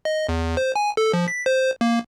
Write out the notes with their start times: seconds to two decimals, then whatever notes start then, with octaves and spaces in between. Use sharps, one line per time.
0.05 D#5
0.29 E2
0.57 C5
0.76 G#5
0.97 A4
1.13 F3
1.28 B6
1.46 C5
1.81 A#3